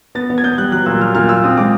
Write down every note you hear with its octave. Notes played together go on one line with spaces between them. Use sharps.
B3 A6
B3
G#6
B3 G6
G3 F#6
F#3 F#6
A#2 E6
F#3 F6
A#2 F6
F4 E6
C4 D#6
G#3 D6